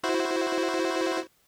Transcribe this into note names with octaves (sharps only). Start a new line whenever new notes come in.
E4 F#4 C5